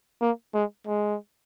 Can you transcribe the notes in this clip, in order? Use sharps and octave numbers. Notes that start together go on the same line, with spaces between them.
A#3
G#3
G#3